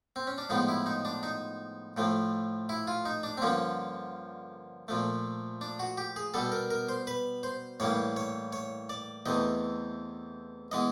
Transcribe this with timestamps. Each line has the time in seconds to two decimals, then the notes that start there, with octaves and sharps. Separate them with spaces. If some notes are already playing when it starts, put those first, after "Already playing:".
0.16 C4
0.27 C#4
0.38 D4
0.49 A2 F3 G#3 B3 D#4
0.68 E4
0.86 D#4
1.05 D4
1.23 D#4
1.97 A2 F3 A3
2.69 E4
2.87 F4
3.05 D#4
3.23 D4
3.37 C4
3.42 G2 D3 F3 A#3 C#4
4.88 A#2 F3 A3
5.61 D4
5.80 F#4
5.98 G4
6.16 G#4
6.34 B2 G3 B3 A4
6.52 A#4
6.70 A#4
6.89 C5
7.07 B4
7.43 C5
7.80 A2 E3 G3 A#3 C#5
8.16 C#5
8.53 C#5
8.89 D5
9.26 E2 C3 E3 A3 D#5
10.71 E3 G#3 B3 D#5